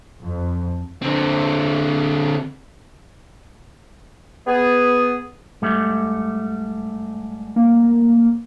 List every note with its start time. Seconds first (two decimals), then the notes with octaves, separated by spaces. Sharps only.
0.23 F2
1.02 D3 C4
4.47 B3 G#4
5.62 G#2 G3 A3
7.56 A#3